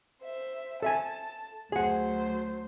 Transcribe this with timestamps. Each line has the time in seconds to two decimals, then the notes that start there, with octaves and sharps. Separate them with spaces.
0.20 C5 E5
0.82 A4 E5 G#5 A5
1.72 D2 F#3 G#4 C5 F#5